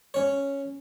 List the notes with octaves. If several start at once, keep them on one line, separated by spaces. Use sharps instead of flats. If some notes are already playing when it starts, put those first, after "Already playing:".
C#4 C#5